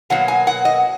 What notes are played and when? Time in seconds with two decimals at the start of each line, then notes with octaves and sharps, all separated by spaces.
0.10 B2 F#3 A#3 F#5
0.28 G#5
0.47 F#5
0.65 D#5